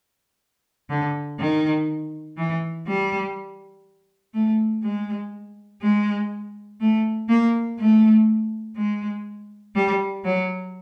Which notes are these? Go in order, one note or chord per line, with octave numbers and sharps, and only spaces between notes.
D3
D#3
E3
G3
A3
G#3
G#3
A3
A#3
A3
G#3
G3
F#3